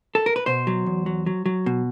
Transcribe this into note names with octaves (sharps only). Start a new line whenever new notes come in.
A4
A#4
B4
B2 C5
F#3
E2
F#3
F#3
F#3
B2